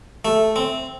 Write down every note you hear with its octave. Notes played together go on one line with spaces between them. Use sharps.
A3
C4